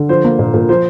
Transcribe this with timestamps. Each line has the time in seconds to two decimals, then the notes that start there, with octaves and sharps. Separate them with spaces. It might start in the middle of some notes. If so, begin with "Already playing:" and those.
Already playing: D3
0.09 F3 C5
0.24 A#3
0.39 A#2
0.54 A#2
0.69 F3 C5